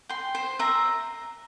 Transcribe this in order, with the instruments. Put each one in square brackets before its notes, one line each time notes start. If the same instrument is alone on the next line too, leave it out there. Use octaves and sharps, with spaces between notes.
[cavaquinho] G5 C6
C5
E5 A#5